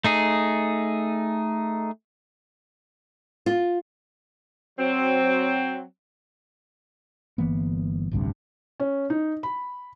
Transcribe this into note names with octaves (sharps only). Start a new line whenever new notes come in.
A3 D#4 G#4
F4
F#3 C4
G1 E3 A#3 B3
A1 D2 G2 C3
C#4
D#4
B5